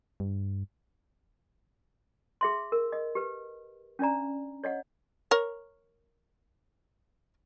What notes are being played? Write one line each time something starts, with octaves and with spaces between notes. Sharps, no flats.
G2
G#4 E5 C6
A#4
D#5
G4 B4
C#4 D4 D5 A#5
C#5 D#5 F#5
A#4 C#5